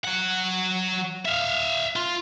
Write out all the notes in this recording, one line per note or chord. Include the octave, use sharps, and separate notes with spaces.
F#3 F#5
E5 F5
F4